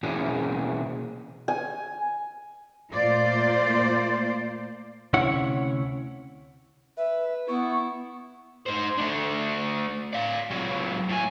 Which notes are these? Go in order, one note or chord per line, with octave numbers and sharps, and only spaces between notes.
B2 E3 A#3 C#4 F#4 G#4
G#5
A#2 A3 A#3 F4 C5 D5
D2 C3 C#4 E4 C#5 F#5
B4 E5
B3 E4 C#6
D#4 C5
A3 D4
D5 F5
C#2 F#3
A2 G#5